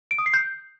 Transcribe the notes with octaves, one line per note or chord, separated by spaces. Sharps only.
D7
D#6
C7
G6